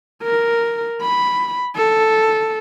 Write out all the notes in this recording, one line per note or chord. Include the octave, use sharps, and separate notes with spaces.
A#4
B5
A4